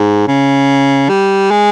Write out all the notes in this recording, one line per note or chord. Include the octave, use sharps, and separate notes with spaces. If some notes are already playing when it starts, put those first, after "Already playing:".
Already playing: G#2
C#3
G3
G#3